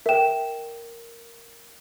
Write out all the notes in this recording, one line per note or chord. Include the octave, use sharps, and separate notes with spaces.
A#4 E5 G5 E7